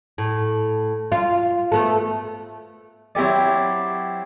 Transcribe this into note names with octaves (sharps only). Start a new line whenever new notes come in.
A2
F4
A3 B3 A4
F#3 C4 E4 G4 D5